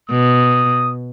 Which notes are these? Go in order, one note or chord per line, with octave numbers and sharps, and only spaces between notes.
B2 D#6